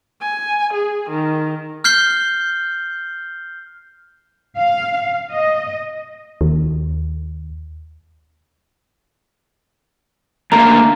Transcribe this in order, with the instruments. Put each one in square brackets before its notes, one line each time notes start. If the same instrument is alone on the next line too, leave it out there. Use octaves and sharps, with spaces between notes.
[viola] G#5
G#4
D#3
[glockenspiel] F6 G6 C7 G7
[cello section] F5
D#5
[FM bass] D#2
[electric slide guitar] D3 A3 A#3 [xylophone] A#5